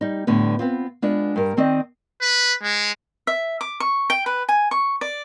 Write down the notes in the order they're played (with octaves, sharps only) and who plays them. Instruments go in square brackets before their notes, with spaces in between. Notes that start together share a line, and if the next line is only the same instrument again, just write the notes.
[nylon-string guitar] G3 D#4
A2 D3 G3 B3
B3 C4 F4
G#3 B3 D4 F4
G2 A#4
D#3 C4 D5 D#5
[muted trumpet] B4
G#3
[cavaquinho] E5
D6
C#6
G5
B4
G#5
C#6
D5